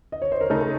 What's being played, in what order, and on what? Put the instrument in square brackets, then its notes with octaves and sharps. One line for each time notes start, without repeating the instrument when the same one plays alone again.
[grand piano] D#5
C#5
C5
A#4
[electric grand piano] C#3 A3 D#4 [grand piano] A4
[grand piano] A4